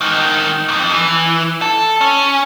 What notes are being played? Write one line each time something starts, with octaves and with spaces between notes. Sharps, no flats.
G#2 D#3
F2 G#2
E3
A4
C#4